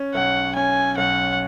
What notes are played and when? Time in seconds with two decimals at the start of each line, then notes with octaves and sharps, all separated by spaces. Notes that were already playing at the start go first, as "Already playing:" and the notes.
Already playing: C#4
0.14 B1 F#5
0.55 C#4 G#5
0.97 B1 F#5